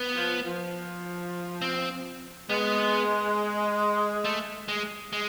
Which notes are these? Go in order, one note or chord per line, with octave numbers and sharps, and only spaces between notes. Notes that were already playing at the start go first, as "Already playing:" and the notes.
Already playing: B3
F3
F3
C4
G#3 B3
A3
G#3
G#3